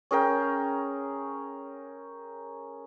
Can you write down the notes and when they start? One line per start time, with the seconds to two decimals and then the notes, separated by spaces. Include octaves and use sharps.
0.11 C#4 G#4 A#4 G5